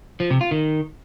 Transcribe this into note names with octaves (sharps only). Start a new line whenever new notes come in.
F3
C3
F4
D#3